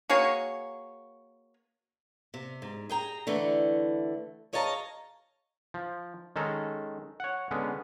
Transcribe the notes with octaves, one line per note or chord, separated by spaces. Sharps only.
A#3 F#4 G#4 C#5
C3
G#2
G#4 G5 A#5
D3 E3 A3
G#4 C#5 D#5 F5 A5 A#5
F3
D#3 G#3 C#4 A4 A#5
C#5 F#5
D3 G#3 B3 C#4